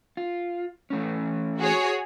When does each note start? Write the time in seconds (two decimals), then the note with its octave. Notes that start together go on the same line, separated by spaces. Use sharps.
0.17 F4
0.90 E3 A3 C#4
1.59 F#4 G#4 C#5